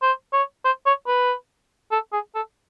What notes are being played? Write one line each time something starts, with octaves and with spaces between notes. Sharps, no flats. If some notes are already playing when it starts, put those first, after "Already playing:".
C5
C#5
C5
C#5
B4
A4
G#4
A4